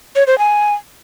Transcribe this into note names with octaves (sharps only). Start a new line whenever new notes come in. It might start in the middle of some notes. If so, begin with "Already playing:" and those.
C#5
C5
G#5